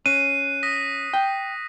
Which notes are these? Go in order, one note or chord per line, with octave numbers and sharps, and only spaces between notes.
C#4 F#6 C7 D#7
D#6 A#6 B6
G5